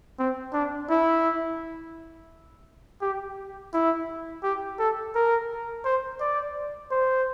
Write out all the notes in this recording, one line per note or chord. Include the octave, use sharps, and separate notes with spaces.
C4
D4
E4
G4
E4
G4
A4
A#4
C5
D5
C5